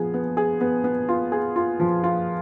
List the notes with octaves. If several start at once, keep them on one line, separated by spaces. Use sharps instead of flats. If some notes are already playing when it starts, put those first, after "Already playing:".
Already playing: F3 B3 G#4
B3
G#4
B3
B3
F4
G#4
F4
F3
F4